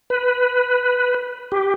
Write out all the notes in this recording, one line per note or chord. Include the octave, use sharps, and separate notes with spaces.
B4
G4